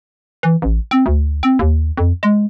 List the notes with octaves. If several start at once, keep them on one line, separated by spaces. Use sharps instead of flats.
E3
A1
C4
D2
C4
D#2
F2
G#3